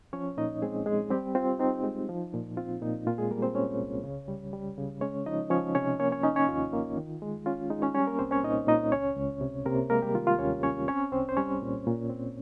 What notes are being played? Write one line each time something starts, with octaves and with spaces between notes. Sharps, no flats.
F3 C#4 C#5
A#2 D#4 D#5
G#3 C4 G#4
G#3 G#4
G3 C4 G4
C4 F4
C4 D#4
G#3
F3
A#2
C4 F4
A#2 D#4
A#2 F4
G#3 G#4
G3 A#3 A#4
C4 C5
C#4 C#5
C2
C#3
G3
G3
C#3
G#3 C#4 C#5
F3 D#4 D#5
F3 C#4 C#5
C3 C#4 C#5
A#3 C#4 C#5
C#4 C#5
C#4 D#4 D#5
C#4 C#5
D#2 F4
A#3
D#3
G#3
C#4 F4
G#3 D#4
C#4 C#5
G3 C#4 C#5
A#3 A#4
C2 C4 C5
C#4 C#5
A#2 D#4 D#5
A#2 D#4 D#5
C#2 C#4 C#5
C#2
C3
C3 A#3 A#4
G#3 A#3 A#4
G3 G4
D#3 F4
F4
D#2 C#4 C#5
C#4 C#5
C4 C#4 C#5
C2 C4 C5
C5
G3 C#4 C#5
A#2
A#2
C4